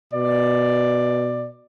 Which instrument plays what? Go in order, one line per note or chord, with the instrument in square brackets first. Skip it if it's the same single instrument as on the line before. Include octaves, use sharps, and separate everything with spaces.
[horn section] B2 D5